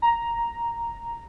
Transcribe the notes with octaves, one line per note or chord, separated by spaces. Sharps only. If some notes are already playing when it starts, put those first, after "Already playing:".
A#5